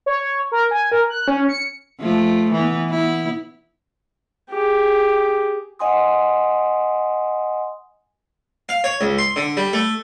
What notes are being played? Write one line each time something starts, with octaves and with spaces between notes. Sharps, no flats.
C#5
A#4
G#5
A#4
F#6
C#4
C#7
F3 A3
E3 B3
B3 E4
G4 G#4
D#5 F#5 G#5 C6 D#6
F5
C#5
C#2
C6
D3
G3
A3